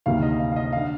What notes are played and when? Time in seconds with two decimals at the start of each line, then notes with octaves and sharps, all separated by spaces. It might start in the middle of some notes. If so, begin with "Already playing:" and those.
0.06 D2 C3 D#3 A#3 F5
0.23 D#5
0.40 F5
0.52 F5
0.56 D#5
0.73 D3 F5